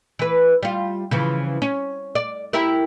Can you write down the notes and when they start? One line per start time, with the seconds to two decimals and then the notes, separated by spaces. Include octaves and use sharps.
0.19 E3 B4
0.63 G3 F4
1.11 C#3 E3 F3
1.62 C#4
2.15 D5
2.53 E4 G4 A#4